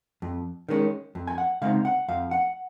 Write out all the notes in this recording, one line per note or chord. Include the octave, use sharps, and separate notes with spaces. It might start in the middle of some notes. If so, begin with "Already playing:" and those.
F2
D#3 G#3 C#4
F2
G#5
F#5
C#3 G#3 C4 D#4 F5
F#5
F2 F5
F#5